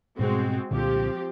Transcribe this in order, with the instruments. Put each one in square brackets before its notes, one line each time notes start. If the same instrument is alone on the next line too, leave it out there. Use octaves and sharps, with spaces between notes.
[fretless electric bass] G#2 B2 G3 [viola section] G#3 C4 F#4
[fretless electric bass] C2 A#2 D3 [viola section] F3 C4 G4